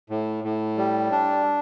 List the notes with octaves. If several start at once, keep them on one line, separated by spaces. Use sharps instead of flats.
A2
A2
G3
D4